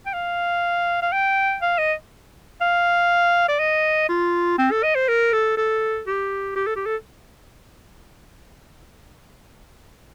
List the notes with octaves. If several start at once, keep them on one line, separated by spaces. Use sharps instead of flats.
G5
F5
F5
G5
F5
D#5
F5
D5
D#5
F4
C4
A4
D#5
C5
A#4
A4
A4
G4
G4
A4
G4
A4